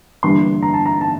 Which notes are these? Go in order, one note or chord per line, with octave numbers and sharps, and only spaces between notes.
G1 G2 E3 G3 A#3 C6
A#5
A5
A#5
A5